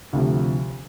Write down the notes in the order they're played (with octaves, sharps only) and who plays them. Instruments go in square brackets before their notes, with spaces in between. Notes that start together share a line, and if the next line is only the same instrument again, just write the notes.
[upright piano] D2 C3 F3